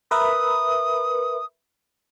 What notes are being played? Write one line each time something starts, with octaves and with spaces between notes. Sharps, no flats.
A#4 B4 E5 D#6